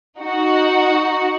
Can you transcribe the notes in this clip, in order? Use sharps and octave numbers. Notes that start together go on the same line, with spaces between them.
D#4 F#4